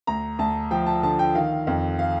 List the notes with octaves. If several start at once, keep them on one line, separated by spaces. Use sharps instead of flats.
D2 A#5
D2 A5
F3 G5
A5
D3 A5
G5
D#3 F5
F2
F5